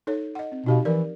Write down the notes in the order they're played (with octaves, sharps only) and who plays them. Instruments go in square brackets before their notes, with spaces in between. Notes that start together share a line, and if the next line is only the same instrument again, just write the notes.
[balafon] D#4 A4 C#5
D#5 F#5
C4
[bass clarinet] B2 [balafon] D#4 G4 F5
[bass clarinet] E3 [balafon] F3 A#4 D5